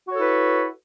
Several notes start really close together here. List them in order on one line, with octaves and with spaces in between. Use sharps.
F#4 C#5 A4 E4 B4